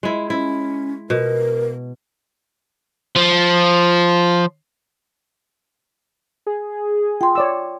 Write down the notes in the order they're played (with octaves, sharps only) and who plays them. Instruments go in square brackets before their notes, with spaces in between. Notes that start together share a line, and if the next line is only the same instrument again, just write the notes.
[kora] G#3 E4
[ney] C#4 [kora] E4
[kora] B2 [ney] A#4
[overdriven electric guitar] F3
[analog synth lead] G#4
[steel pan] F4 [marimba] G5 C6
[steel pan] C#5 D5 E6